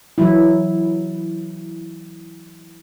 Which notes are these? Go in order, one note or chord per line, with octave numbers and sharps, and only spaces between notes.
E3 F#3 E4